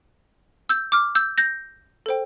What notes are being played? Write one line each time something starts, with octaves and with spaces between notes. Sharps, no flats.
E6 G6
D6 F6
E6 G6
G6 A#6
A4 C5 G5